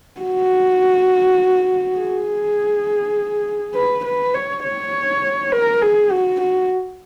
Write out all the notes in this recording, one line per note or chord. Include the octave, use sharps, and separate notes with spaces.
F#4
G#4
B4
B4
C#5
C#5
A#4
G#4
F#4
F#4